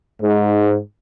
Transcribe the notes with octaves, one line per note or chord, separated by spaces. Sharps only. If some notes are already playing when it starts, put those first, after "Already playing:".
G#2